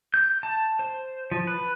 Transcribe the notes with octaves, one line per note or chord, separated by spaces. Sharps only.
G6
A5
C5
F3
B4